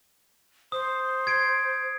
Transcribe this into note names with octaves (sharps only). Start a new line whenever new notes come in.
C5 D#6
G#6 C7 D7